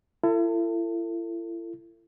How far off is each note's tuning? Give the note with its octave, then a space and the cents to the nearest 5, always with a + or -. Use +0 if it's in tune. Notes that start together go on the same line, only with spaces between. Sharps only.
E4 +40 A4 +35